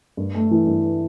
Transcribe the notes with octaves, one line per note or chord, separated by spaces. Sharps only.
G2
A3
E3
G2